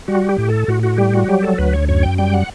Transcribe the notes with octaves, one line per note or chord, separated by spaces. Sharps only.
G3 F#4
G4
A2
A4
A2 F#4
F#4
G3 G4
F#4
F#3 G4
A4
D2 B4
C#5
F#2 C#5
G5
G3 G5
F#5